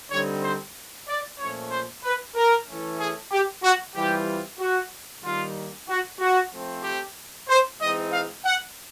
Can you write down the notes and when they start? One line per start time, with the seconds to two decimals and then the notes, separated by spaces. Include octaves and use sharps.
0.11 D3 G3 C4 D#4 C#5
0.44 C5
1.08 D5
1.39 A#2 F3 A3 C#4 C#5
1.71 C5
2.04 B4
2.35 A#4
2.67 E3 A3 C#4
3.00 G#4
3.32 G4
3.63 F#4
3.95 E3 G3 C4 F4 G4
4.59 F#4
5.24 D#3 G3 A#3 D#4 F4
5.89 F#4
6.20 F#4
6.53 F3 A3 C4
6.84 G4
7.49 C5
7.81 E3 G#3 C4 D#4 D#5
8.13 F5
8.45 F#5